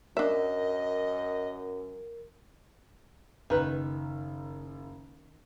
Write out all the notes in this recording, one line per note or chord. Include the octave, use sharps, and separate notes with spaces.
F#2 D4 A#4 D#5 E5
F#1 D#3 B4